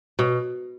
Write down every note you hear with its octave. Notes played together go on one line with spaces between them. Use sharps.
B2